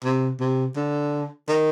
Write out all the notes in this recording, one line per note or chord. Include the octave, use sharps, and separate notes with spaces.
C3
C3
D3
D#3